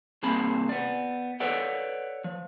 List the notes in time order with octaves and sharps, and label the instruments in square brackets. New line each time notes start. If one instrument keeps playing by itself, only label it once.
[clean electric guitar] C2 A#3 C4 G#4 A5 B5
B3 D5
A4 B4 C#5 D5 F#5
F3